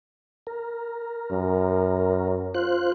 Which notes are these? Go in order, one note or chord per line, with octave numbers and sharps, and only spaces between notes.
A#4
F#2
F4 C5 F#6